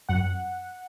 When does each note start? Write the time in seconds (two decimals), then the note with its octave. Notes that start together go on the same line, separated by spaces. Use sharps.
0.09 F#2 F#5